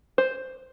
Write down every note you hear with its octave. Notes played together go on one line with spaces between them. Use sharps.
C5